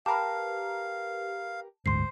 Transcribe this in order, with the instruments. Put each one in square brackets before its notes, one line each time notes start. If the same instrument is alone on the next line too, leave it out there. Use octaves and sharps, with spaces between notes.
[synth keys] G4 A#4 B4 [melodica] F5 [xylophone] A5
[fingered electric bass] F#1 D2 G#2 [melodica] C5 [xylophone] C6 C7